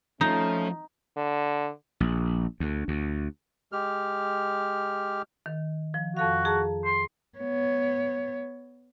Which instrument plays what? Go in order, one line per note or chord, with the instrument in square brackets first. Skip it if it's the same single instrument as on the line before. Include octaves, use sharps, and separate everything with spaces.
[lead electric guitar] F3 [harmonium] A3 C#4 [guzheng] D#4
[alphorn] D3
[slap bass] A#1
D2
D2
[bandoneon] G#3 G4 F6
[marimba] D#3
F3
[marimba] F2 A4 F5 [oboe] F#4
[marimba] G#4 A5 A#5
[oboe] C6
[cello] B3 C#5